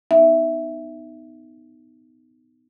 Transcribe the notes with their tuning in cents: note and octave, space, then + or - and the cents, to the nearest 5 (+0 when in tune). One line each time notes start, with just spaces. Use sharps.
B3 +20 D#4 +0 E5 +0